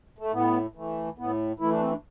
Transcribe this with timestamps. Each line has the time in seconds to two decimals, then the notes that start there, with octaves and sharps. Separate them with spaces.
0.19 A3
0.33 A2 B3
0.76 E3 A3
1.18 A2 B3
1.60 E3 A3 E4
1.71 D4
1.80 C4
1.91 D4